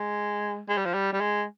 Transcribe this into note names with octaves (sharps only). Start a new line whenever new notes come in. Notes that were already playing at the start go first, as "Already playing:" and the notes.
Already playing: G#3
G#3
G3
F3
G3
G3
G#3